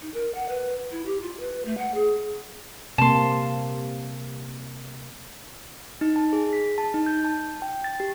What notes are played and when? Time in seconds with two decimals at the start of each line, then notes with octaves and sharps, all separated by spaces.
0.01 D#4
0.14 A#4
0.34 F#5
0.49 B4
0.91 E4
1.06 G4
1.21 F4
1.40 B4
1.65 A3
1.78 F#5
1.94 G#4
2.98 C3 A#3 A5 C6
6.01 D#4
6.16 A5
6.33 G#4
6.53 B6
6.78 A5
6.94 D#4
7.06 G6
7.24 A5
7.62 G5
7.84 A6
8.00 G4